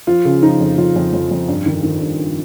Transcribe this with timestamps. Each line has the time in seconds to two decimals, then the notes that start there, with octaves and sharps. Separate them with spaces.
0.07 F3 F4
0.25 C#3
0.42 F3 D#4
0.60 F2
0.78 F2 F4
0.96 F2
1.13 F2
1.31 F2
1.48 G2
1.66 D#3
1.83 D#3
2.01 G2
2.19 G2